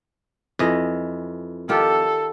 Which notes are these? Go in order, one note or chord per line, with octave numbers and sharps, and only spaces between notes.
F2 E3 G#4 D#5
D#3 F4 G4 A4